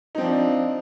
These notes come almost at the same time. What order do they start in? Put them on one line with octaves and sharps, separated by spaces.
D#4 C4 F3 D4